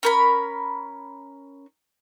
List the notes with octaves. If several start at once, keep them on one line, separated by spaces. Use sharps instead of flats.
C#4 A#4 B5